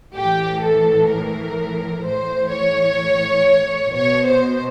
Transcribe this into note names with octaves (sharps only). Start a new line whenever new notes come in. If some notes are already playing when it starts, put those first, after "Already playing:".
A2 E3 G4
A4
A#4
A2 E3 C5
C#5
B2 C#5
C5